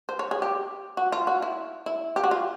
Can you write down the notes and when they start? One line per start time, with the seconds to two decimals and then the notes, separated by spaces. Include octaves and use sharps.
0.09 C5
0.19 C#5
0.31 G#4
0.42 G4
0.97 F#4
1.12 F4
1.27 F#4
1.42 E4
1.86 E4
2.16 G4
2.24 F#4
2.31 F4